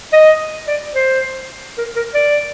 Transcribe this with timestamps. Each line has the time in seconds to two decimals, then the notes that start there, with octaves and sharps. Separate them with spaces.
0.13 D#5
0.68 D5
0.95 C5
1.78 A#4
1.96 A#4
2.15 D5